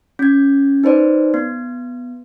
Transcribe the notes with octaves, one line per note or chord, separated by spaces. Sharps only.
C#4 G#6
D#4 B4 C5 D5
B3